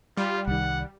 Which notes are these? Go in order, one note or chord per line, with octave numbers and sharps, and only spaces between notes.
G3 F4
C2 D#3 F#5